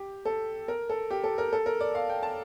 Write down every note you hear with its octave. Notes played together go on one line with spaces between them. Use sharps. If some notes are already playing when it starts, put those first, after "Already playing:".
Already playing: G4
A4
A#4
A4
G4
A4
A#4
A4
A#4
D5
F5
G5
A5